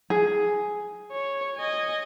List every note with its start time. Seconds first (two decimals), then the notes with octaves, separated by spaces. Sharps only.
0.10 G#4
1.12 C#5
1.56 D#5 G#5